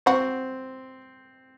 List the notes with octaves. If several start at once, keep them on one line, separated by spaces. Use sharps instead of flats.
C4 F#4